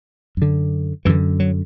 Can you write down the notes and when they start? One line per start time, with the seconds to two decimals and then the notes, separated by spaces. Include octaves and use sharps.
0.37 F#2 D3
1.05 F#2 D3 E3
1.40 F#3